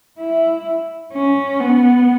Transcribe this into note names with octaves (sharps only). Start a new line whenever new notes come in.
E4
C#4
B3